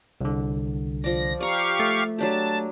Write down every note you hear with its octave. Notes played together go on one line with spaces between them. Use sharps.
C2 D3
F3 D5 A#6
G4 D5 F5 A#5 C#6
A3
F#3 D4 G4 A5